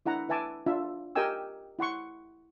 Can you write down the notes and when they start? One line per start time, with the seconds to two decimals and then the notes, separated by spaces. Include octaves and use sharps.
0.06 D4 E4 F#5 A#5
0.29 E4 B4 E5 G#5 A5 D6
0.66 D4 F4 E5
1.15 G4 A#4 D#5 G5 G#5 E6
1.79 E4 F#5 C6 C#6